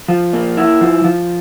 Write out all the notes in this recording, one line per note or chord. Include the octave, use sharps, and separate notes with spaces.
F3
A#3
E4
F3
F3